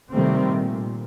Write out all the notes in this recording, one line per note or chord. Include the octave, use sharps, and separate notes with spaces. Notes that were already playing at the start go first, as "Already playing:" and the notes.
C3 D#3 G3 A3 C4
A#2